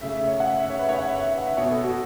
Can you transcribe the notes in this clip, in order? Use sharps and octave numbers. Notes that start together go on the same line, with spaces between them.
C#3 A3 E5
E5
C#5
F#5
E5
E5
C#5
B4
C#5
F#5
E5
C#5
E5
F#5
E5
B2 B3 C#5
A4
F#4